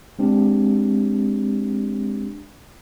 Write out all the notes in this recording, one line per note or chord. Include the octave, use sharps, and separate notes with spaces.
G#3 C4 D4 G4